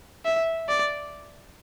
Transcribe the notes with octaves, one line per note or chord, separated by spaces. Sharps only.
E5
D5